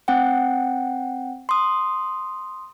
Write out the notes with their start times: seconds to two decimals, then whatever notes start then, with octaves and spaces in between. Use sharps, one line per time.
0.08 C4 F#5 G5
1.49 C6 D#6